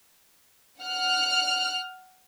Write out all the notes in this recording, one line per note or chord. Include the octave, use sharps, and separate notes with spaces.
F#5 F6 F#6